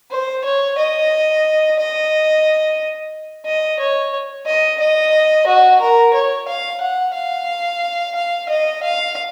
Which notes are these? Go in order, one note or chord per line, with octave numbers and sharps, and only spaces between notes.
C5
C#5
D#5
D#5
D#5
C#5
D#5
D#5
F#4
A#4
C#5
F5
F#5
F5
F5
D#5
F5